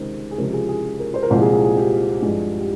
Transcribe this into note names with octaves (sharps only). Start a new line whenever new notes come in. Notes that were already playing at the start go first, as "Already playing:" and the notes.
Already playing: C#2 C3 D#3 G#3 A#4 C5
G#4
C#2 C3 F3 G#3 A#4
G#4
G#4
A#4
C5
A#4
C2 A#2 F3 G#3 C5
G#4
G#4
G#4
G4
G2 F3 G#3
G4